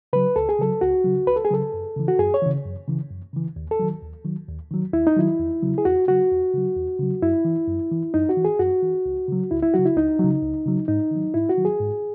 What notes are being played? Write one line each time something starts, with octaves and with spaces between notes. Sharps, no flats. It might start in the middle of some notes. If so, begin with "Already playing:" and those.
C#3 F#3 B4
C#2 A4
G#4
C#3 F#3 A4
C#2 F#4
C#3 F#3
C#2 B4
A4
G#4
C#3 F#3 A4
F#2
C#3 E3
F#4
F#2 G#4
C#5
C#3 E3
F#2
C#3 E3
F#2
C#3 E3
D#2
A4
D#3 F#3
D#2
D#3 F#3
D#2
D#3 F#3
D#2 E4
D#4
D#3 F#3 E4
E2
C#3 F#3
G#4
E2 F#4
C#3 F#3 F#4
E2
C#3 F#3
E2
C#3 F#3
F#2 E4
E3
F#2
E3
F#2 D#4
F#4
E3
G#4
F#2 F#4
E3
C#2
C#3 F#3
C#2 E4
E4
C#3 F#3 F#4
E4
C#2 D#4
C#3 F#3
C#2
C#3 F#3
G#2 D#4
D#3 F#3
G#2 E4
F#4
D#3 F#3
G#4
G#2